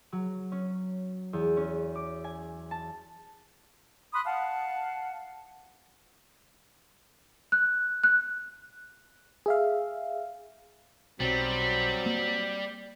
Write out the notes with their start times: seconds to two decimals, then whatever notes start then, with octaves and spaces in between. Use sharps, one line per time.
0.12 F#3
0.52 C#4
1.33 E2
1.57 C#4
1.96 D6
2.24 G#5
2.71 A5
4.13 B5 C6 D#6 F#6
4.26 F5 F#5 A5
7.52 F#6
8.04 F#6
9.46 G#4 E5 F5
11.20 B1 F#3 G3 C4
12.06 A#3